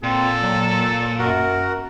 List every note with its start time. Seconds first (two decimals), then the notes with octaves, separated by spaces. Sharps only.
0.03 A#2 C4 A4
0.42 F#3
1.19 F#2 F#4 A#4